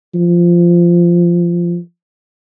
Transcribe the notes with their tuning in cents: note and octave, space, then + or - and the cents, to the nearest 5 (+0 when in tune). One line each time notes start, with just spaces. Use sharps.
F3 -15